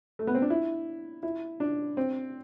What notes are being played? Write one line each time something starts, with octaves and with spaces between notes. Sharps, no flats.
A3
B3
C4
D4
E4
E4
D4
C4